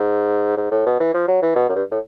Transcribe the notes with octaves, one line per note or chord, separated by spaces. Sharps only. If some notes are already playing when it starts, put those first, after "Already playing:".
Already playing: G#2
G#2
A2
B2
E3
F3
F#3
E3
B2
F#2
G2
A2